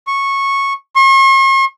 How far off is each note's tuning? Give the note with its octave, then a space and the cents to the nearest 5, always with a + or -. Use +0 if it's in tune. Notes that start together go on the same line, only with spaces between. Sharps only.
C#6 -10
C#6 -45